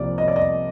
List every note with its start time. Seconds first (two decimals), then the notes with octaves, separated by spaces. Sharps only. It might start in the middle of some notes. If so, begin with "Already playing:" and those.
Already playing: C2 C3 F3 A#3 D5
0.18 D#5
0.28 D5
0.36 D#5